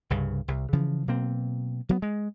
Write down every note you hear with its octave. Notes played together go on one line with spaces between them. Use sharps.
C2 G2 C#3
C2
C#3 E3 F3
B2 F#3 A#3 C4
F#3 A#3 B3
G#3